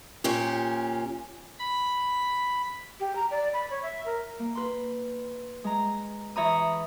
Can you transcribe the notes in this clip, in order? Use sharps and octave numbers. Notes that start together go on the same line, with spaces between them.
A#2 F3 C#4 G4
B5
G4
A#5
D5
B5
C#5
E5
A#4
A#3
B4 C6
G#3 A#5
E3 C#5 E5 A#5 B5 D#6